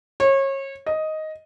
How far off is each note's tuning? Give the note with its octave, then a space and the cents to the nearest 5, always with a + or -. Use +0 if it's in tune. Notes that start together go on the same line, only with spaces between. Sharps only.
C#5 -30
D#5 +5